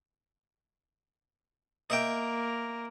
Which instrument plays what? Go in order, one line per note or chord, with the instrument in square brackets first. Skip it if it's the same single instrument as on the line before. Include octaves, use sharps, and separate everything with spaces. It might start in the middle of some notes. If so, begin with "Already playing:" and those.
[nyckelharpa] A#3 A#5 [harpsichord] D#5 E5 G5